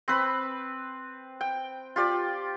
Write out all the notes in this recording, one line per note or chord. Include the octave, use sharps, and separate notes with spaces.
C4 B4 B5
G5
F4 G4 D5